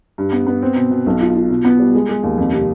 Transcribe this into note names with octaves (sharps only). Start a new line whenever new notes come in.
G2
B3
B3
C4
B2
B2
B1
F4
F4
B2
B3
G3
G#3
G#3
D#2
F2
C3